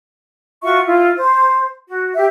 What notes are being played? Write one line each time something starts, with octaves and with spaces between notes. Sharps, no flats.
F4 F#4 E5 C#6
E4 F4
C5
F#4
G4 E5